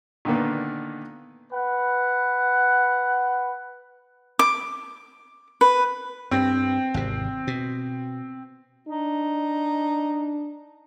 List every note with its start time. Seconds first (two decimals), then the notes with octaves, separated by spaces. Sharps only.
0.25 A#2 D3 D#3 A#3 B3
1.53 B4 F#5
4.39 D6
5.61 B4
6.31 G2 C4
6.94 G#1 E2 C3
7.47 B2
8.88 D4 D#4